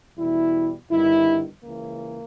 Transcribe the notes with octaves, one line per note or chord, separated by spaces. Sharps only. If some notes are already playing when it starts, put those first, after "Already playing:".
E2 B2 G3 E4
G1 G2 D#3 E4
C#2 C#3 E3 A#3